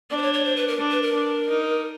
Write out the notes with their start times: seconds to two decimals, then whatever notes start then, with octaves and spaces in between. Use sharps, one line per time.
0.10 D4 D5
0.17 C5
0.22 C#5
0.34 C#5
0.45 C5
0.56 B4
0.68 A#4
0.80 D4
0.91 B4
1.02 A#4
1.14 D4
1.49 D#4